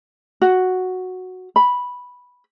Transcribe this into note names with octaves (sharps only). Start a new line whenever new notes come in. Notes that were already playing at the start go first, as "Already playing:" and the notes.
F#4
B5